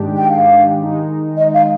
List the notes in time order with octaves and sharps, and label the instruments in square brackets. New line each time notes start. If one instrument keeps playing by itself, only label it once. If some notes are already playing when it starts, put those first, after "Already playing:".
Already playing: [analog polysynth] G#2 D#3 G#3 D4 G4
[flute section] G5
F5
[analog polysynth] D#3 G#3 D#4
[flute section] D#5
F5